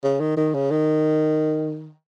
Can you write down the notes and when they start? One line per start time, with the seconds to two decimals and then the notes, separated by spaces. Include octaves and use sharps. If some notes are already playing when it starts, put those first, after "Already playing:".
0.03 C#3
0.20 D#3
0.36 D#3
0.54 C#3
0.71 D#3